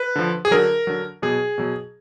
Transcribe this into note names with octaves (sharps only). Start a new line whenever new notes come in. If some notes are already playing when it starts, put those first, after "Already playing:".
Already playing: B4
D3 F3
G#4
D3 F#3 A#4
D3 F#3
B2 F#3 G#4
B2 F#3